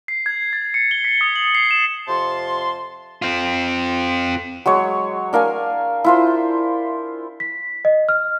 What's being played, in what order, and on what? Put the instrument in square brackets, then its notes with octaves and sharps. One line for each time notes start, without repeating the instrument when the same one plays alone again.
[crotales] C7
G#6
A6
C#7
G7
B6
D#6
F#7
C7
E7
[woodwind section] F2 C3 F5 A5 C6
[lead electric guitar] C4 F4
[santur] F#3 G#3 C#5
D4 A#4 F5 G#5
E4 F4 C5
[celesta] B6
D#5
F6